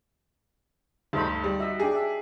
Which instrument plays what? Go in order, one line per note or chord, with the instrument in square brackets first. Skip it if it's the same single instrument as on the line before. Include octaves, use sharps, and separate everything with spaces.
[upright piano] D2 G2 [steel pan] D#4 C5 B5
[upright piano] G3
[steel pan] F#4 D#5 E5
[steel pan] D4 G4 [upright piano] G#4
[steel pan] E5